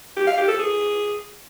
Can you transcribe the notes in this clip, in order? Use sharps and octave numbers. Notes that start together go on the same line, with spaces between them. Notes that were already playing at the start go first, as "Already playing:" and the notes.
G4
F5
G4
A4
G#4